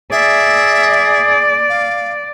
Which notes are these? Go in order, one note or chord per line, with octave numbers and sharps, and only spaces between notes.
G#4 D5 E5
F5